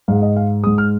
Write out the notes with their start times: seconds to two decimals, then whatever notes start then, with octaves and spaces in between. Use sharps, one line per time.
0.08 G#2 G#3 F5
0.22 D#5
0.36 F5
0.64 G#2 G#3 D#6
0.78 F6